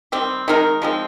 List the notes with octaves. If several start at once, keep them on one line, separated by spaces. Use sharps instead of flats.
D#3 G3 C4
D#3 G#3 D#4 A#4
F3 G#3 C4